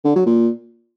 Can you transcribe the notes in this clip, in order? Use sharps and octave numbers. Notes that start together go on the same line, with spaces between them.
D3
F#3
A#2